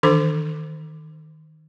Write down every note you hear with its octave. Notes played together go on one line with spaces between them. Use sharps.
D#3 E3 D4 A4 C5 D6